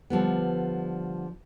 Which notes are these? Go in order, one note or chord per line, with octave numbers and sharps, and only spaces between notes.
D3 F3 G3 B3